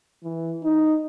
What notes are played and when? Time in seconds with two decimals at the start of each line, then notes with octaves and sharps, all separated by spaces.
0.23 E3
0.63 D#4